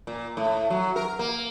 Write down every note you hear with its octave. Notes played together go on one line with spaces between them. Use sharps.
A#2
A2
F#3
A#4
A#3